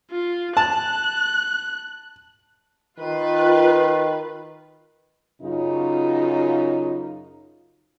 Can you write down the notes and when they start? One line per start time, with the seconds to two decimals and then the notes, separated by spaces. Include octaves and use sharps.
0.11 F4
0.57 A5 F#6
2.99 D#3 F4 B4
5.42 F#2 C#3 D#4 F4